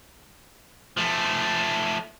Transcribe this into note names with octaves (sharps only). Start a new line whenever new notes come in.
F3 A3